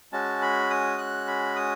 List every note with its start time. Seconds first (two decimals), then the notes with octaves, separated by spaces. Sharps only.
0.13 G#3 C#4 F#4 A5
0.42 B5
0.70 D#6
0.98 F#6
1.28 B5
1.56 D#6